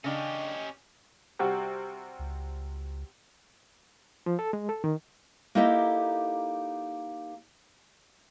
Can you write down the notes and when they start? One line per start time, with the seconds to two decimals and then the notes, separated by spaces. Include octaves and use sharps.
0.04 C#3 C#4 D4 G4 D#5 G5
1.39 C3 G3 F#4
2.19 C#2
4.26 F3
4.39 A4
4.53 G#3
4.69 A4
4.84 D#3
5.55 A#3 D#4 E4 G4 A4 D#5